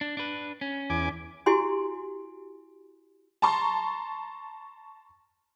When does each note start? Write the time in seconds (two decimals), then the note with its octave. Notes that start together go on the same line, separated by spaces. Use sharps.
0.01 D4
0.17 D4 B4
0.61 C#4
0.90 E2 G#5 D6
1.46 E4 F#4 G4 G#5 C6
3.42 A5 A#5 C6 C#6